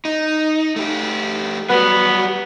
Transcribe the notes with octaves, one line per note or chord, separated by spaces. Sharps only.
D#4
A3 G4
F#3 G3 B3